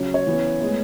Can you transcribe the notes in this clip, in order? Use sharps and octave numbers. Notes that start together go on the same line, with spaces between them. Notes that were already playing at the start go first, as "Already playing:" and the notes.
Already playing: C#3 F#3 C#4
C#5
C#3 E3 B3
A2 G#3 B3